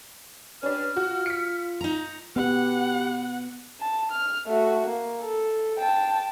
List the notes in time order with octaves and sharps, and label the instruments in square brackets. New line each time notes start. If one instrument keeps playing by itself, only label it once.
[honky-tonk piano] C#4 D4 [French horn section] G4 B4 [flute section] F6
[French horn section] F4 [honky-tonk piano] F#4
[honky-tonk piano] B6 C#7
[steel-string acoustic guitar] D#4 A#5
[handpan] B3 [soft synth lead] G4 [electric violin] F#5
[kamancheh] A5
F6
A3 F#4
A#3
A4
G5 A5